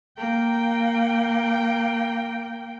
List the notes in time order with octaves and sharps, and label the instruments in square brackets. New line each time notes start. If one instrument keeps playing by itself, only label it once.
[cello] A#3 G5